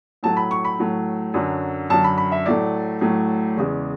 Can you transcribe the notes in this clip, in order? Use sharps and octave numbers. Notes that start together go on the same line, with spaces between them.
A2 F#3 A3 A5
B5
C#6
B5
A2 F#3 A3
F#2 D3 F#3
F#2 D3 F#3 A5
B5
B5
E5
A2 F#3 A3 D5
A2 F#3 A3
E2 C#3 G#3